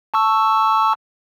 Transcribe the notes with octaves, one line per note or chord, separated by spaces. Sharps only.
A5 C#6 E6